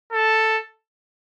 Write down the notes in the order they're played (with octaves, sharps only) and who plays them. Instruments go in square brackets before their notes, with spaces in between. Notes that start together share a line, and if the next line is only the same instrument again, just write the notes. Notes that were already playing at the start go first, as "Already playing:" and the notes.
[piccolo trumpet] A4